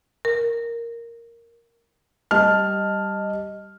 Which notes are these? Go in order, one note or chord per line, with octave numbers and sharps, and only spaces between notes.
A#4
G3 D#5 A5 F6